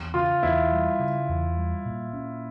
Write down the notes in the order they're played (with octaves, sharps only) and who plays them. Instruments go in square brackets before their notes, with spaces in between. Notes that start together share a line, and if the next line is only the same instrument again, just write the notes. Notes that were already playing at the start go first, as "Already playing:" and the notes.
Already playing: [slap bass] E2
[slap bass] C#3 [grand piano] F4
[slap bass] E2 [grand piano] E4
[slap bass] G3
C#3
E2
G3
A#2
C#4